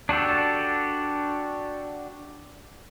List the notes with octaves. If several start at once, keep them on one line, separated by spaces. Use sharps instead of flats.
D4 F#4 G4 A4